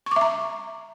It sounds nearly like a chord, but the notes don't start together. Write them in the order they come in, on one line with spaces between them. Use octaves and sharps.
C#6 D6 E5 A#5